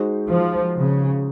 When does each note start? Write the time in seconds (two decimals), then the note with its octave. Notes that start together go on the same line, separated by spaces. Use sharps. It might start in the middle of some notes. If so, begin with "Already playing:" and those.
Already playing: G#3 D#4 F#4 C5
0.29 F3
0.76 C#3